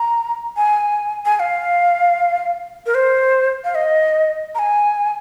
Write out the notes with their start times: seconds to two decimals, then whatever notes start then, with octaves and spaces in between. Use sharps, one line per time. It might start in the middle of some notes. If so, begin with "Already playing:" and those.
Already playing: A#5
0.57 G#5
1.25 G#5
1.36 G#5
1.40 F5
2.86 A#4
2.95 C5
3.64 F5
3.75 D#5
4.55 A#5
4.59 G#5